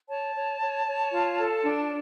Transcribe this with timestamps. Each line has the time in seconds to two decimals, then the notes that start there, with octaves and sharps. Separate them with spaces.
0.09 C#5 A5
0.35 C#5
0.61 C#5
0.86 C#5
1.12 F4
1.38 A4
1.64 D4